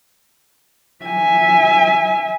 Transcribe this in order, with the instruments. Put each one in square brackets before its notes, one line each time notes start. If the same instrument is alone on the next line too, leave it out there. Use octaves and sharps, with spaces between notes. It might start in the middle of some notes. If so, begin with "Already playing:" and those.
[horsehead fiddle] E5 G#5